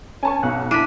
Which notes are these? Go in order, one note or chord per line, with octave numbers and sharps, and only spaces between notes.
C#4 G#5 A5 C#6
B1 F#5
D4 E4 B6 D#7